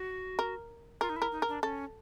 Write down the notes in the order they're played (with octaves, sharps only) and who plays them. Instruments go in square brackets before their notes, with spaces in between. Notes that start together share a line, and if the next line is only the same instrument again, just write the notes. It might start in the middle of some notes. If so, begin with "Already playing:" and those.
Already playing: [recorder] F#4
[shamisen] A#4
[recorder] F4 [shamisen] A#4
[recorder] D#4
E4
[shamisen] A#4
[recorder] D#4
[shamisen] A#4
[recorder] D4
[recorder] C#4 [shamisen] A4